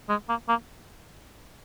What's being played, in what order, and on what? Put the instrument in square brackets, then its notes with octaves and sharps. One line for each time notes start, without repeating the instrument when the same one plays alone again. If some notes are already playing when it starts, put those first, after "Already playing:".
[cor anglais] G#3
A#3
A#3